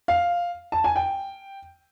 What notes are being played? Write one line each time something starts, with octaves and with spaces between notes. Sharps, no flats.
F5
A5
G#5
G5